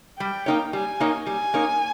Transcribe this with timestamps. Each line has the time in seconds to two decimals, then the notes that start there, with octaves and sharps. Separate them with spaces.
0.19 G3 G5
0.46 A#3 D#4 A#4 C#5
0.73 G3 G#5
1.00 A#3 D#4 A#4 C#5
1.26 G3 G#5
1.54 A#3 D#4 A#4 C#5